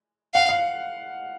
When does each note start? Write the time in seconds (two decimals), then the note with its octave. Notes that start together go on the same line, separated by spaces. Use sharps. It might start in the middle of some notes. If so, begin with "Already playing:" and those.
0.34 F5 F#5
0.49 F5